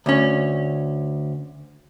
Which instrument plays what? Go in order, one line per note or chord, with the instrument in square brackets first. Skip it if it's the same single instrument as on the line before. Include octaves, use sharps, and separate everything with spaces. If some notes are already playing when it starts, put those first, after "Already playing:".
[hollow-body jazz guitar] D2 C#4